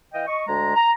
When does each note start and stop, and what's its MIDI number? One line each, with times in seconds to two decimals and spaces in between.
0.13 0.25 52
0.13 0.25 75
0.13 0.25 77
0.13 0.25 79
0.26 0.41 75
0.26 0.41 85
0.47 0.74 38
0.47 0.74 56
0.47 0.74 82
0.75 0.90 82